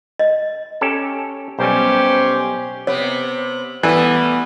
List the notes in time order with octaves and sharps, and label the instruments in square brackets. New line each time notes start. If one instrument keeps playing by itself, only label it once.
[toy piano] D#5
[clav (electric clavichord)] C#4 G4 A4
[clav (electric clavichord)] B1 G3 [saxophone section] C#4 G4 C5
[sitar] C3 B3 [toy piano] C#5
[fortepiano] E3 [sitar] G3 A3 [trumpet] B3